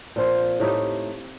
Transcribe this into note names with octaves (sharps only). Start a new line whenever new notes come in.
A#2 F3 C4 F4
A2 A3 D#4 G4